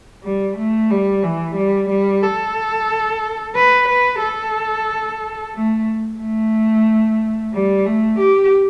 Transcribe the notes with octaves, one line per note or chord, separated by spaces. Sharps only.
G3
A3
G3
E3
G3
G3
A4
B4
B4
A4
A3
A3
G3
A3
G4